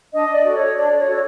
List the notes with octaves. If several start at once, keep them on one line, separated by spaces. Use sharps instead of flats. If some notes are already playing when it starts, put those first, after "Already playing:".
D4 D#5
D5
F#4 A4
C#5
D4 D5
C#5
F#4 A4